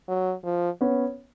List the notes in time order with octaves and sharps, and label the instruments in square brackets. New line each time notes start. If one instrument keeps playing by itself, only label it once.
[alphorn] F#3
F3
[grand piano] B3 C#4